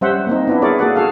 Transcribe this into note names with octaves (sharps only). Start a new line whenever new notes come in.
G3 C#4 C5 E5 F#5
A#3 C4 D#4
B3 D4 E4
E4 G#4 A#4 C#5 D5
A#3 F#4 G#4 A4 D5 F#5
F#4 G#4 A4 F5